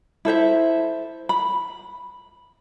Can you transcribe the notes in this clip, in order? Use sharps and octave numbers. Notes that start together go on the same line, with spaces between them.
E4 A4 C5 E5
B5